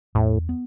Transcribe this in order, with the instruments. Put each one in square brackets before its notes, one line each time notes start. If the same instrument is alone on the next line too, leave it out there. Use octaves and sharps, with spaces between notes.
[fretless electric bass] E2 [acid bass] A2
[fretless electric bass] B3